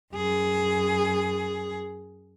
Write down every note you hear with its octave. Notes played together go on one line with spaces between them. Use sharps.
F#2 G#4